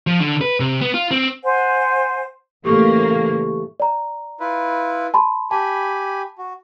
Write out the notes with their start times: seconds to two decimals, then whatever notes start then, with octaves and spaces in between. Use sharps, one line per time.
0.07 F3
0.21 D3
0.41 B4
0.60 C3
0.81 B3
0.94 F4
1.11 C4
1.45 C5 F#5 G#5
2.65 A2 C#3 E3 A3 A#3 G4 A4 C#6
3.80 D5 A#5
4.40 E4 F4 B4
5.14 A5 B5 C6
5.51 G4 G#5 A5 B5
6.38 F#4